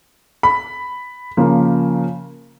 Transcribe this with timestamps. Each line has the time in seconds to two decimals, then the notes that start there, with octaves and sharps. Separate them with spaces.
0.43 B5
1.37 C#3 F3 A#3